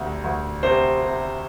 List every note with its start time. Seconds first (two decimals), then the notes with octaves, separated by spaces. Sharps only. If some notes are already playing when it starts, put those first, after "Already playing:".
Already playing: D2 C3
0.24 D2
0.63 C3 C5
1.02 C3